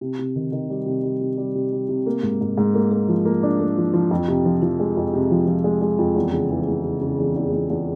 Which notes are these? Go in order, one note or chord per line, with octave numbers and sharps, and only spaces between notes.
C3
C3
D#3
D#3
G3
C3
G3
C3
G3
C3
G3
C3
A#3
G#2
G#2
G#2
A#3
A#3
F3
A#3
D4
A#3
F3
F3
F2
C3
F3
F3
G#3
F2
C3
F3
F3
G#3
G#3
F2
E2
C#3
E3
E2
C#3
C#3
E2
E2
E2
E2